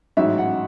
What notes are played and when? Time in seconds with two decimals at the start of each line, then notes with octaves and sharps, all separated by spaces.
0.17 A1 G#2 F#3 E5
0.38 F#5